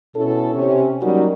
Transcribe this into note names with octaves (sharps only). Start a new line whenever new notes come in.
B2 C#4 E4 A4
C3 C#4
F#3 G3 A#3 C#4 D#4 F#4